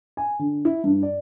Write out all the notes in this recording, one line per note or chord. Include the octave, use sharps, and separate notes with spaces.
G#5
D3
E4
G2
D5